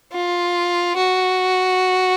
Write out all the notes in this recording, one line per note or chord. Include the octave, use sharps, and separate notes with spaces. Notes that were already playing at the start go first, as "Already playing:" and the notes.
F4
F#4